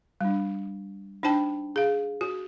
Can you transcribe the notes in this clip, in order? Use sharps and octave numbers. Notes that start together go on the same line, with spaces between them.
G3 D4
D4 D#4 C5 G5 A5
G#4 F5
F#4